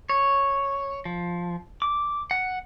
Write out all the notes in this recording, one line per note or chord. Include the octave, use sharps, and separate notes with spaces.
C#5
F3
D6
F#5